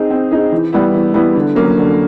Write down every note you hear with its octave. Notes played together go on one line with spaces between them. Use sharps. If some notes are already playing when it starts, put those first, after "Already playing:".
Already playing: C4 D#4 G#4
C4
D#4 G#4
E3
G3 B3 E4
E3
G3 B3 E4
D3
F#3 A#3 C#4
D3